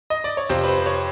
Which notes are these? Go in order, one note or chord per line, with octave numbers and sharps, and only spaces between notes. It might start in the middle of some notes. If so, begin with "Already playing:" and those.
D#5
D5
C#5
F2 C3 F3 C5
B4
C5
C#5